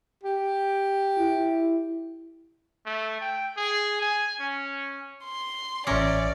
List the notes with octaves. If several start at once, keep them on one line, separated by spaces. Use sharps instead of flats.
G4
E4
A3
G5
G#4
G#5
C#4
C6
A1 C#4 A#4 D5 E5 D6